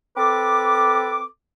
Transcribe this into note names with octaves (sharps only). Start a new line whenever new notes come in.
C4 A4 B4 D6